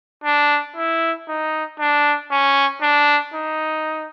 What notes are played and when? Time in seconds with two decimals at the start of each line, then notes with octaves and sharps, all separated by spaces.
0.24 D4
0.76 E4
1.28 D#4
1.79 D4
2.31 C#4
2.82 D4
3.34 D#4